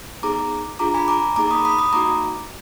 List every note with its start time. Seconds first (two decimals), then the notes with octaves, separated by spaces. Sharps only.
0.23 B3 D#4 G#4 A#5 D6
0.79 D4 F4 G#4 A#5 D6
0.94 G#5 B5
1.08 A#5 D6
1.36 A#3 D#4 G#4 A#5 D6
1.51 B5 D#6
1.65 B5 D#6
1.79 B5 D#6
1.93 A#3 D#4 F#4 A#5 D6